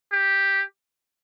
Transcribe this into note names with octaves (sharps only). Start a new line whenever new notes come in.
G4